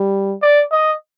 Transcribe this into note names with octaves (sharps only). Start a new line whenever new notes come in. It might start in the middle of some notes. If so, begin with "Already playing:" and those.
Already playing: G3
D5
D#5